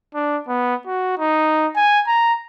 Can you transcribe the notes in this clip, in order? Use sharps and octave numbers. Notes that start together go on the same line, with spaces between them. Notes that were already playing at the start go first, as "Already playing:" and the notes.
D4
B3
F#4
D#4
G#5
A#5